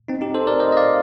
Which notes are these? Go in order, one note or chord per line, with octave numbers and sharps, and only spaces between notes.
C4 D#4
D#4 G4
A4 C5
A#4 D5
C5 D#5
D#5
D5 F5